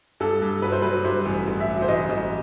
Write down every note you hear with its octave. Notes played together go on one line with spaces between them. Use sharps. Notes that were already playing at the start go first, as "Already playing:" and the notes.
G2 A4
G2
F#3 B4
C5
F#3 B4
G2 C5
A1
A1
E5
F#3
C5
A1 D#5
A1